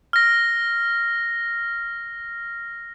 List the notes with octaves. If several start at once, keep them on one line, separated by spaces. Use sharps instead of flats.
F6 A#6